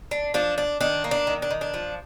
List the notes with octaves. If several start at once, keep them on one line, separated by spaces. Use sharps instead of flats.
D4
F3 D4
D4
D#3 D4
A#3
D4
D#3
D4
D#3
D4
F3